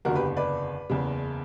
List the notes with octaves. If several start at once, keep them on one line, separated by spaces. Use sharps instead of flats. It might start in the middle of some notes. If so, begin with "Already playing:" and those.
F#1 E2 D3 F#4 A#4
G4 B4
B4 D5
F#1 E2 C#3